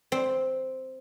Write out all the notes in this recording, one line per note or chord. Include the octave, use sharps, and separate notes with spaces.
C4